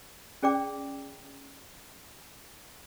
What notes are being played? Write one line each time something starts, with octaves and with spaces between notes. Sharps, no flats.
C#4 G#4 D5 G5 D6